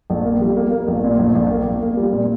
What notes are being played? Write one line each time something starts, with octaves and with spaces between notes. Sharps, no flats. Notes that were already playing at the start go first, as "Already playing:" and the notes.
A#1
A#3
G3
A#3
A#3
A#1
A#2
A#1
A#1
A#3
A#3
A#3
G3
A#2